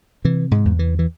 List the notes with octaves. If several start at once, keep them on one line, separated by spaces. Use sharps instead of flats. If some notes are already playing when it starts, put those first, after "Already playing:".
C3 E3
G#2 G#3
E2
E3
E3